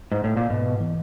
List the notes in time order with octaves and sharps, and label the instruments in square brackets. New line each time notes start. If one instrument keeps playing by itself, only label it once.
[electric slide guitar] G#2
A2
A#2
[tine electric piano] G#2 [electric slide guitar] B2
[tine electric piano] E3